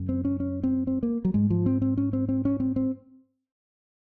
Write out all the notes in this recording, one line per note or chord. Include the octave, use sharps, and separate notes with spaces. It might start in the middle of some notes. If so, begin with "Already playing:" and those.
Already playing: F#2 C#3
C4
C#4
C#4
C4
C4
A#3
F#3
G#2 G#3
F3
C4
C4
C#4
C4
C4
C#4
C4
C4